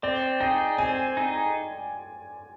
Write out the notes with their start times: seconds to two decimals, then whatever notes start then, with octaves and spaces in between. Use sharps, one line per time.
0.03 C4 D5
0.40 D#4 G#4 G5
0.78 C4 G#5
1.17 D#4 G#4